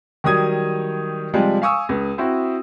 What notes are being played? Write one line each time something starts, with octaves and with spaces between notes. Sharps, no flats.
D#3 F#3 G3 D#6 G#6
C3 F3 G3 G#3
F5 G#5 C#6 D#6 E6
C#2
C4 E4 F#4